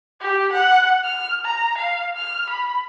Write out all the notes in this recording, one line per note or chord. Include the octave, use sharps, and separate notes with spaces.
G4
F#5
F6
A#5
F5
F6
B5